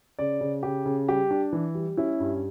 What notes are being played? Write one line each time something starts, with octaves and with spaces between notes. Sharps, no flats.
C#3 D5
C#3
C#3 G4
C#3
G3 G4
D4
E3
G3
C#4 E4
G2